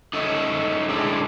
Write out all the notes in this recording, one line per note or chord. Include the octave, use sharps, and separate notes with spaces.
D#4 A4 C#5 E5
G#3 D4 E4